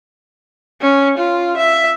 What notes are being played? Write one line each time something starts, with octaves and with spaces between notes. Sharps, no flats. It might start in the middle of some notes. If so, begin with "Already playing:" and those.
C#4
F4
E5